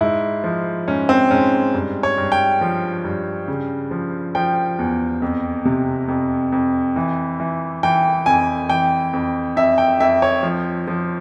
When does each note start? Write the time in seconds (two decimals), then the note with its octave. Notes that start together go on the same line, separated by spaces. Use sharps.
0.01 G#2 E4
0.44 F3
0.88 G#2 C#4
1.09 C4
1.31 G#2 C#4
1.74 G2
2.03 C#5
2.18 G2
2.32 G5
2.61 F3
3.04 G2
3.48 C#3
3.91 F3
4.35 F3 G5
4.79 E2
5.22 F2
5.65 C3
6.08 F2
6.52 F2
6.96 E3
7.40 E3
7.83 E3 G5
8.26 F2 G#5
8.69 E3 G5
9.13 F2
9.56 F2 E5
9.78 G5
10.00 F2 E5
10.22 C#5
10.43 F3
10.87 F3